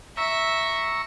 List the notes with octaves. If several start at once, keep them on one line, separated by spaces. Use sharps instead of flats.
E5 A#5 C#6 E6